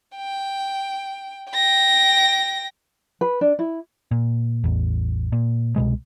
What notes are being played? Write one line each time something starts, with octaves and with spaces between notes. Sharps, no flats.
G5
G5 A#6
B4
D4
E4
A#2
A1 E2
A#2
C2 B2 G#3